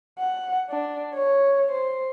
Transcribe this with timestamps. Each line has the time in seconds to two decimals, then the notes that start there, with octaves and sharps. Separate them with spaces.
0.18 F#5
0.70 D4
1.15 C#5
1.72 C5